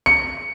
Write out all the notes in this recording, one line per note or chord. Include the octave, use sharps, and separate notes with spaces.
C#7